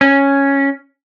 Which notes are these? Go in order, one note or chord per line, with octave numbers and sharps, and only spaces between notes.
C#4